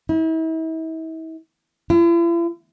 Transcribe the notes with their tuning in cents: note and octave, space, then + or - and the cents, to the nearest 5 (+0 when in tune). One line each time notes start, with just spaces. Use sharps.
E4 -40
E4 +45